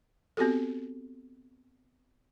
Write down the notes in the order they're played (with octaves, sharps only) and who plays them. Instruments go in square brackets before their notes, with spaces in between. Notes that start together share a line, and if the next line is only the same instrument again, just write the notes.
[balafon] B3 C4 F#4 G4 A4